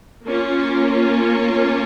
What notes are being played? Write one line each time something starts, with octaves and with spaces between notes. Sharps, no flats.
A#3 C#4 F4